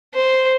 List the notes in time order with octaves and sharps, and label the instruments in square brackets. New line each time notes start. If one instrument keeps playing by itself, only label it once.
[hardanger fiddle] C5